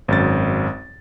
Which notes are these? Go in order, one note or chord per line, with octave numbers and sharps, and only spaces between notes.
G#1 F#2 A6